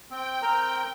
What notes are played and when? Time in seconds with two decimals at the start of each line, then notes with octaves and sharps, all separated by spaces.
0.11 C4 G5
0.42 C4 A#4 A#5